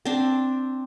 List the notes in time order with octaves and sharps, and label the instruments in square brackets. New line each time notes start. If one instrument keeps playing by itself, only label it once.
[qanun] C4 D4